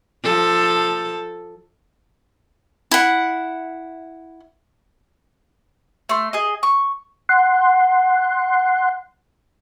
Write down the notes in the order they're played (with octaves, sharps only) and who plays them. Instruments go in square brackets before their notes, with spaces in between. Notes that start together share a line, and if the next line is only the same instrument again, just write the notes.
[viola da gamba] F3 A4
[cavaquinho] E4 F#5
[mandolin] A3 C6
G#4 D#5
C#6
[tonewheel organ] F#5 C6